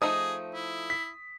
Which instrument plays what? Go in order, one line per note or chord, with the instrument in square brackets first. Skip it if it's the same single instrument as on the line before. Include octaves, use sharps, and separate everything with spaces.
[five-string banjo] F3 A3 D#4 [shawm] G#4 [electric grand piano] D#6
[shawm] E4
[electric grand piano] B6